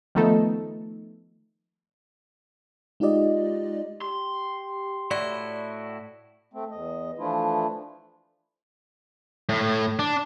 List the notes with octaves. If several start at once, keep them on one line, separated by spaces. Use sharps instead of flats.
D#3 F3 A3 B3 D#4 A4
G#3 D#4 F4 G4 D5 D#5
G4 C6
A2 E4 F#4 D5
A3 C4
E2 D#5
E3 F3 A3 D4 E4 F4
A2
D4